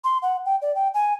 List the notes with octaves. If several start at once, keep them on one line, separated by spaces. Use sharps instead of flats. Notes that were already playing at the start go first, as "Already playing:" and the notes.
C6
F#5
G5
D5
G5
G#5